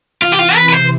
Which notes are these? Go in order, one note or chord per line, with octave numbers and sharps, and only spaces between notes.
C3 E3 F4
G4
F4
B4
B4
C5